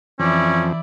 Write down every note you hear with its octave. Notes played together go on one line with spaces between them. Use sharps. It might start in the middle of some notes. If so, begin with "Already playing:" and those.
F2 E3 C#4 E4 D5